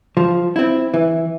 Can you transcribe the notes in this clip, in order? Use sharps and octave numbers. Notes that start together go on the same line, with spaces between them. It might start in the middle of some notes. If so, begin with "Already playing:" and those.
F3
C4 E4
E3